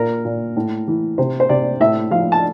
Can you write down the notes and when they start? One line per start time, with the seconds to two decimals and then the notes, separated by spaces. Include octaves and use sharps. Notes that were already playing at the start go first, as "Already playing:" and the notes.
Already playing: A#2 A#4
0.25 A#2
0.56 A2
0.87 E3
1.18 C3 C5
1.40 C5
1.49 C3 D5
1.80 A2 E5
2.11 F3 F5
2.32 A5